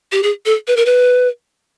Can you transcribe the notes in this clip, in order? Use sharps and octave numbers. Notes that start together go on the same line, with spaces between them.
G4
G#4
A4
B4
A#4
B4